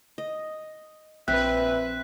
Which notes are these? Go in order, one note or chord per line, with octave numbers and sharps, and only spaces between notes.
D#5
A#1 C4 B4 E5 F#6 B6